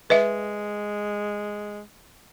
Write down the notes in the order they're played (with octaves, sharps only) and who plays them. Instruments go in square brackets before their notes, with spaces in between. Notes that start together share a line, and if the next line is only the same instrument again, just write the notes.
[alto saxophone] G#3 [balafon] B4 D#5 E5